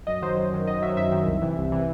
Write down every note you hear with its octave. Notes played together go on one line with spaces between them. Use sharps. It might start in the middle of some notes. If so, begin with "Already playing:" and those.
F#2 D#5
D#3 F#3 C5
F#2
D#3 F#3
F#2 D#5
D#3 F#3 E5
F#2 E5
D#3 F#3
C2
C3 E3
C2
C3 E3